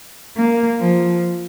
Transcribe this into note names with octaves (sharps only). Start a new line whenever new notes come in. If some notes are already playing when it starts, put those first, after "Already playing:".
A#3
F3